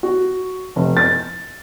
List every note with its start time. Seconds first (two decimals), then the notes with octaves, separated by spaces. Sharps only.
0.03 F#4
0.76 F1
0.97 A6